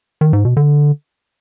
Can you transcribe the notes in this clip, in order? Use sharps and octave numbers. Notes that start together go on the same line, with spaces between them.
D#3
G#2
B2
D3